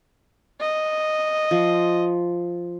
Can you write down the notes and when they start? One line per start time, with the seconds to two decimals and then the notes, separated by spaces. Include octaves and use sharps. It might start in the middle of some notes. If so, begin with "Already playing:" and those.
0.60 D#5
1.51 F3